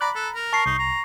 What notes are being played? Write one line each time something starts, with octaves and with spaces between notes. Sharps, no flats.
D5 A#5 B5 F#6
A4
A#4
A5 C#6 C7
C2 D#4
A#5